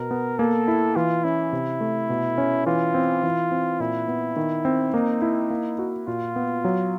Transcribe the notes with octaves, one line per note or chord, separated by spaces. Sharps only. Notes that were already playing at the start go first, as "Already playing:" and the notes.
Already playing: B2 A#4
B3
A#3 A4
E4
E3 F4
C#4 E4
C3
A3
B2
C#4
E3 F4
C4
E3
C4
A#2 E4
B3
D#3
C4
A#3 D#4
E4
A#3
F#4
A#2 F4
B3
F#3